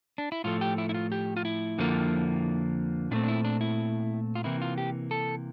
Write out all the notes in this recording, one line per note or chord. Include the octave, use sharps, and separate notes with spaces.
D4
E4
A2 F3 A3 F4
G4
E4
E4
F4
G4
F4
E4
F2 D3 F3 A#3
A#2 A3 C4 D4
D4
E4
D4
E4
F4
C3 E3 A#3 E4
F4
G4
A4